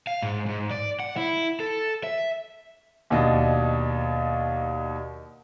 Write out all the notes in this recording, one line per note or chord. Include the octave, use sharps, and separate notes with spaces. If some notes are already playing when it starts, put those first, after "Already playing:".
F5
G#2
G#2
D5
F#5
E4
A4
E5
D#2 B2 D4 D#5